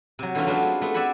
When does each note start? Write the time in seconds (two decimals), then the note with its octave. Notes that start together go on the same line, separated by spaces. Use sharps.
0.19 C3 F#3
0.35 D3 E3 F#3 A3 C#4 F4
0.46 F#3 A3 B3 C4 D4 F4
0.62 G#3
0.81 A3 B3
0.94 C4 D5 E5 F#5 G#5 B5